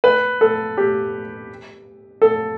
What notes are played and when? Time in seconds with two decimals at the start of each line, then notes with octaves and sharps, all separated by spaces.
0.04 B4
0.41 A4
0.77 G4
2.22 A4